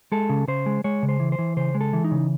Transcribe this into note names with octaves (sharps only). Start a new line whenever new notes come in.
G#3 A4
C#3
C#3 C5
G#3
G#3 C#5
C#3
C5
E3
C5
E3
C#3 C5
G#3
A4
E3
D#4
C#3